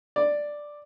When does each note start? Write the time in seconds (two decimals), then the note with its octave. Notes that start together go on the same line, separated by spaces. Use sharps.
0.16 D5